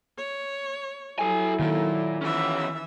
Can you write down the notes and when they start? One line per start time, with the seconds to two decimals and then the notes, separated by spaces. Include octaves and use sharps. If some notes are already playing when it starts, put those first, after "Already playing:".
0.17 C#5
1.19 F#3 E4 A4 G#5
1.59 A#2 D#3 A4
2.21 E3 F3 C#4 E5